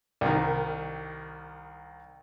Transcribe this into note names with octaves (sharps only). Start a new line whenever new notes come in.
C2 D#3